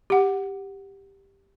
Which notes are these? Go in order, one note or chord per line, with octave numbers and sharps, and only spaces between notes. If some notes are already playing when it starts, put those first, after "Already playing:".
G4 F#5